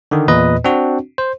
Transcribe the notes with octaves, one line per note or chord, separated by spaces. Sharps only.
D3 D#3
E2 A#2 B4 D#5
C4 D4 F#4
C5